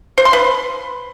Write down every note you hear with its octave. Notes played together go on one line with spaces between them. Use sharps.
C5
C6
B4